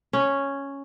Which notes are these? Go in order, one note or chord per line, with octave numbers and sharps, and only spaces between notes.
C#4